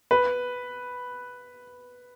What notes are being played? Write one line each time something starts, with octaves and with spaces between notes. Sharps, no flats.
B4